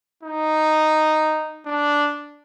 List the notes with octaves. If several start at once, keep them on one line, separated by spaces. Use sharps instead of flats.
D#4
D4